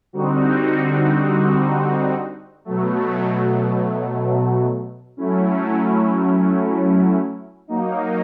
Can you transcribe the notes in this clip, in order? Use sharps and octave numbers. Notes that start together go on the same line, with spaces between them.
D3 G3 C4 D#4 F#4
B2 F#3 A3
F#3 A3 C#4 E4
F#3 A#3 D#4